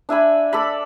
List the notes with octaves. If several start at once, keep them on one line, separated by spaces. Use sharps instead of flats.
D4 E5 G#5 B5
A4 D5 A5 B5